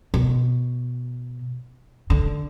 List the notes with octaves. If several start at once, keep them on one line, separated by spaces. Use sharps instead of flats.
B2
D3